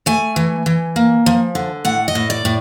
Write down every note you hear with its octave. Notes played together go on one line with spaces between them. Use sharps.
A3 G#5
E3
E3
A#3
F3
D3
A2 F#5
D#5
A2
D5
A2